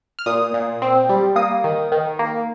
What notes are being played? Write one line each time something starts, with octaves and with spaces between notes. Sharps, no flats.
F6
A#2 D#6
A#2
C4
G3
A#3 D#6
D#3
D#3
A#3